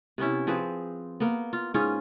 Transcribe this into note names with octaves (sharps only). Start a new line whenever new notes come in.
C3 B3 C#4 E4
F3 C4 G#4 B4
A#3 B3
F4
G#2 C#4 F4 G#4